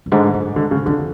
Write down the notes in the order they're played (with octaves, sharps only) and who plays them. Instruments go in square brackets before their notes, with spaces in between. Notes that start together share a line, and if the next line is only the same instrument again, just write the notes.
[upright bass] F#2
[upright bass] G#2 [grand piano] D3
[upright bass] F#2
[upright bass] G#2 [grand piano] D3
[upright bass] G#2 [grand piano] C#3
[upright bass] F2 [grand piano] D3